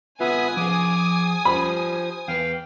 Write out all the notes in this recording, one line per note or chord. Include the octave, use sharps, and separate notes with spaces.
D3 B3 F4 B4 E5 G#5 D#6
F3 G#4 C5 D6
F3 D4 G4 B5
E2 B4 F5 G5